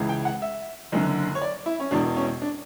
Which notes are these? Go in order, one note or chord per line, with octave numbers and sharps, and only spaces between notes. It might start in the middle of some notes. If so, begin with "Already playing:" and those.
Already playing: C#2 C#3 E3
G5
F#5
E5
F#1 F#2 D3
C#5
D5
E4
C#4
E1 E2 B2 D4
C#4
D4